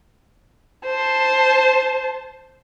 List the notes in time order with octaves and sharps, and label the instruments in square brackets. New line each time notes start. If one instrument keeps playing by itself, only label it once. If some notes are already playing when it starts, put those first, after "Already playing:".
[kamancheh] C5 A5